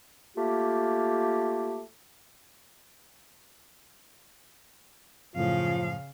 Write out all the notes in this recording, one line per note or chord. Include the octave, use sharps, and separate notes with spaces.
A3 A#3 F4 G4
F#2 A2 C#3 F3 F4 F5